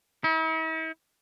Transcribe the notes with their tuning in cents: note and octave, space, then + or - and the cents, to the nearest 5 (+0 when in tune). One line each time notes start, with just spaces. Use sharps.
E4 -45